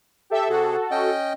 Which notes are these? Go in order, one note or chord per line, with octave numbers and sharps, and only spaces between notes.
G4 A4 E5
C3 F#4 G#4 A4
C#4 D#5 G5